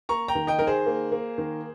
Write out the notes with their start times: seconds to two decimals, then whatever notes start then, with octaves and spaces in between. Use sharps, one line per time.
0.09 A#3 A#5 C#6
0.28 G5 A#5
0.35 D#3
0.47 D#5 G5
0.59 D#3 A#4
0.67 G#4 C5
0.86 A#3
1.12 A#3
1.38 D#3